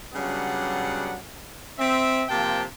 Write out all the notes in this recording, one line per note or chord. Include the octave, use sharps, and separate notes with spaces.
C#3 F#3 G3 B3 D4 F#5
C4 E5
C3 F3 A#3 G5 A5